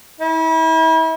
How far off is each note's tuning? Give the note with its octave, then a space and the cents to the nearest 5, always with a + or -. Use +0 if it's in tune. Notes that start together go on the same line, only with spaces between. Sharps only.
E4 -35